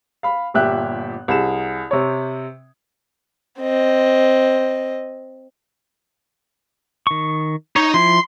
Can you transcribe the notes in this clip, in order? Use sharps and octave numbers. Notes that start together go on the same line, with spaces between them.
F5 B5
G1 A#2 G4 E5 F#6
C2 G#4 E7
C3 C4 C#5
C4 D#5
D#3 C#6
D#4 C#5
F3 E4 C6